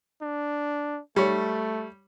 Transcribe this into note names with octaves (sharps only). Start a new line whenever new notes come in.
D4
G3 A3 C#5